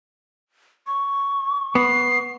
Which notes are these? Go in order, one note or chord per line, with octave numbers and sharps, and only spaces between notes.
C#6
B3 C7